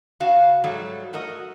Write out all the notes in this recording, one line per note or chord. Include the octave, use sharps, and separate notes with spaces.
C#3 F#4 F5 A5
G#2 F#3 G3 A3 A4
A3 F#4 A#4 D#5